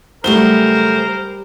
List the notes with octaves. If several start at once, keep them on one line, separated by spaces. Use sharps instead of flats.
F#2 C#3 G3 A3 A#4 C5 G7